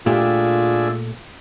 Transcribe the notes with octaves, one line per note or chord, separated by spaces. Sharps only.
A#2 A3 D4 F4 G4 G#4 E5